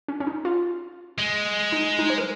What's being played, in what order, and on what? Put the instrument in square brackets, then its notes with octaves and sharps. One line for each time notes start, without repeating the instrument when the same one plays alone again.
[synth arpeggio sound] C#4
C#4
D#4
F4
[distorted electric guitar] G#3
[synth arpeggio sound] D#4
D#4
C5
A#4